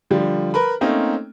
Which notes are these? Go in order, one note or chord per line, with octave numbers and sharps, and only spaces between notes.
D3 F3 G3
A#4 B4 B5
A3 A#3 C4 C#4 D#4